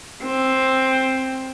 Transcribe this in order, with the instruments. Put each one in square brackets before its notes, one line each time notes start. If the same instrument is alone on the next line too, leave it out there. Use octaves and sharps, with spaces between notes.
[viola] C4